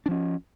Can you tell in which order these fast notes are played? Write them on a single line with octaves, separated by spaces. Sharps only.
D4 F3 C#4